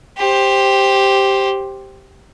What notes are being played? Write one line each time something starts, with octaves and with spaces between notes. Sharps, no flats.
G4 C5